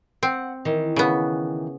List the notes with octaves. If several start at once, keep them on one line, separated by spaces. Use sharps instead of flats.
C4 F#5
D#3 E3
C#3 B3